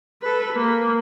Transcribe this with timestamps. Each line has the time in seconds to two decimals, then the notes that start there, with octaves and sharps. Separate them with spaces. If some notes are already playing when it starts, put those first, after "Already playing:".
0.22 A4 B4
0.53 A#3